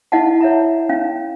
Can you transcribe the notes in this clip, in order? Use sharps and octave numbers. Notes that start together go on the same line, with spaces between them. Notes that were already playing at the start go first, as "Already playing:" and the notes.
E4 D#5 F5 F#5 A5
C#5 E5 A#5
C#4 F5